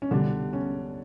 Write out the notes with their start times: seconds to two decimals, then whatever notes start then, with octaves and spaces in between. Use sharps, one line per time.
0.02 C#4
0.11 C2 B2 D3 G3 D4
0.53 C#4